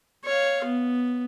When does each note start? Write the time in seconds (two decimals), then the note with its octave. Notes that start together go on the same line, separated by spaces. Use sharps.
0.25 C#5 F5
0.65 B3